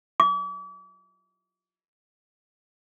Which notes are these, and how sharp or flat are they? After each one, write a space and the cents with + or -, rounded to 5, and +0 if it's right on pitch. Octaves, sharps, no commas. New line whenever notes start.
D6 -40